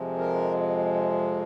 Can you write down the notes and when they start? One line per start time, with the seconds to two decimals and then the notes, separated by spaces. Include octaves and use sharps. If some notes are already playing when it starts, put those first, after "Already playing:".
Already playing: F2 C3 F3 G#3
0.18 A#4